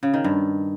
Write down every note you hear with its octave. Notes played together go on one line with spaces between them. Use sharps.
C#3
D#3
G2